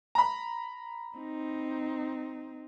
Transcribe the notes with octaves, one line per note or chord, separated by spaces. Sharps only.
A#5 B5
C4 D#4